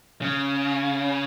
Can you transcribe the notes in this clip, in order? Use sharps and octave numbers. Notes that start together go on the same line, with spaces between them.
C#3